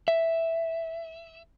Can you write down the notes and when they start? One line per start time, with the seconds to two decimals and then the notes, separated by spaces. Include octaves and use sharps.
0.08 E5